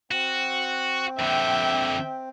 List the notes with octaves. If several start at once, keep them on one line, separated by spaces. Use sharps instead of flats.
C4 F#4
F2 D3 E5 G5